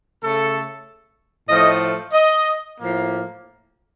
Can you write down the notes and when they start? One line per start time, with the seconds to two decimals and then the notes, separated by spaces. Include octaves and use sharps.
0.21 C#3 A3 A4
1.48 A2 F3 A3 D#5
2.13 D#5
2.77 A2 F3 A#3